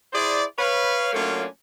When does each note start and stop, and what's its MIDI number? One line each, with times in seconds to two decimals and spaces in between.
0.13 0.43 64
0.13 0.43 68
0.13 0.43 72
0.13 0.43 74
0.57 1.11 71
0.57 1.11 73
0.57 1.11 77
1.13 1.45 54
1.13 1.45 57
1.13 1.45 58
1.13 1.45 61
1.13 1.45 62
1.13 1.45 65